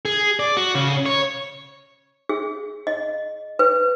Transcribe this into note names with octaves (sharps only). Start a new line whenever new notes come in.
G#4
D5
F#4
C#3
C#5
G#4
D#5
B4